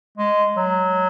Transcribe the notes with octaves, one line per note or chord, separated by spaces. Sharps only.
G#3
F#3